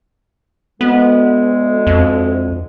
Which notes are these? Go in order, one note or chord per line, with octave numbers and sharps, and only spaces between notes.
D2 G#3 B3
F2